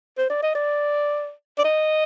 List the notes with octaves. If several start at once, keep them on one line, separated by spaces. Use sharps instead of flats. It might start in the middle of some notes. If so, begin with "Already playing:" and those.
C5
D5
D#5
D5
D5
D#5